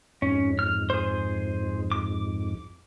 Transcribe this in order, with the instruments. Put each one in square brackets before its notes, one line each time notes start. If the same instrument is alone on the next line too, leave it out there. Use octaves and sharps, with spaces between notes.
[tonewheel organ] F2 G#2 [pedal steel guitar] C#4
[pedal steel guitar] F6
G#4 C5
D6